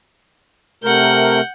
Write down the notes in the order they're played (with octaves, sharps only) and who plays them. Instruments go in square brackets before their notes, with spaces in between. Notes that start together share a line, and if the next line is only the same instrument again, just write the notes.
[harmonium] C3 A3 A#4 [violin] F#5 G6